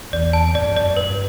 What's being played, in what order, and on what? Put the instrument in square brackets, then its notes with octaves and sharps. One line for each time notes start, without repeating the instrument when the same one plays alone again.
[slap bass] E2 [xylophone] D5
[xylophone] A5
[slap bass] F#2 [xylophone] D5
[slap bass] E2
F#2
[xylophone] D5
[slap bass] G2 [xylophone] B4